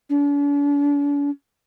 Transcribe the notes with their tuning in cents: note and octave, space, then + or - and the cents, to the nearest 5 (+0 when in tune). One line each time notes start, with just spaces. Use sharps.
D4 -45